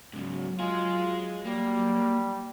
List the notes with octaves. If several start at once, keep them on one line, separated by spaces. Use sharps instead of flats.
G#2 C#3 F#3
G#3 F4 G#4
G3 A#3